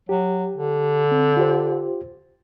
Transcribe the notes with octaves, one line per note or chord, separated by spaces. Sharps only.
F#3 G4
D3
C4
F4 G4 C5